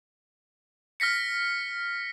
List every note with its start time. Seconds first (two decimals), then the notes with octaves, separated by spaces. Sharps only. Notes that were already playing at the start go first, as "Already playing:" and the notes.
1.00 F6 A#6 B6 C#7